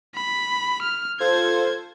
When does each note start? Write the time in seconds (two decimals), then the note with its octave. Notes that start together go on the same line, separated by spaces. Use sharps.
0.15 B5
0.82 F6
1.20 F4 A4 C5 G#6